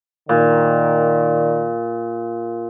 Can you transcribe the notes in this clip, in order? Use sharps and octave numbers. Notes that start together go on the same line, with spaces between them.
A#2 D#3 D5